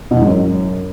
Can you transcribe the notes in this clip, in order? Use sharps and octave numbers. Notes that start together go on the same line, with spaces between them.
B2
E2
G#2
F#2